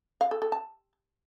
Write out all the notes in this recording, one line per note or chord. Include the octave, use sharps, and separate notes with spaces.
F5
A4
A4
A5